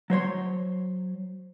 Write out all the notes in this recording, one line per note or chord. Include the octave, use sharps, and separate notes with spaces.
F#3 C5 C#5 C6